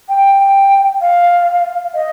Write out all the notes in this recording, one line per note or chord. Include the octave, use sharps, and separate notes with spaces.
G5
G5
F5
D#5